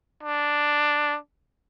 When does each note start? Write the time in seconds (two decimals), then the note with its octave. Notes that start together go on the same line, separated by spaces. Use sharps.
0.24 D4